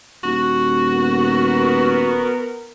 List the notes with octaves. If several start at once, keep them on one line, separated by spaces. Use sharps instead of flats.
D#1 F#4
B3 A#4